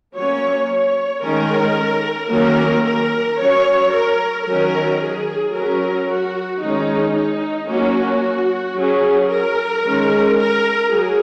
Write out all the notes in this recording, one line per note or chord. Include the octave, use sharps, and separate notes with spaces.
F#3 A#3 C#4 C#5
C#5
D#3 G#3 C#4 A#4
D#3 F#3 A#3 C#4 A#4
A#4
F#3 C#4 C#5
A#4
D#3 F#3 C#4 A#4
G#4
F#3 C#4 A#4
F#4
D#3 G#3 C#4 D#4
D#4
F#3 A#3 C#4 F#4
F#3 C#4 G#4
A#4
D#3 G#3 C#4
A#4
F#3 G#4